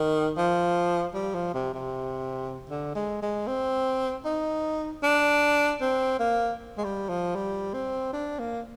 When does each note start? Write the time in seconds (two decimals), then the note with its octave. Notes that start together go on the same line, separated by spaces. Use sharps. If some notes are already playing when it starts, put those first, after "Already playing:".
Already playing: D#3
0.37 F3
1.15 G3
1.35 F3
1.54 C3
1.74 C3
2.70 D3
2.95 G#3
3.22 G#3
3.48 C4
4.25 D#4
5.03 D4
5.81 C4
6.19 A#3
6.78 G#3
6.84 G3
7.09 F3
7.36 G3
7.74 C4
8.13 D4
8.39 A#3